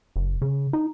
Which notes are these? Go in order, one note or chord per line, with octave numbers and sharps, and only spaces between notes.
F#1
C#3
D#4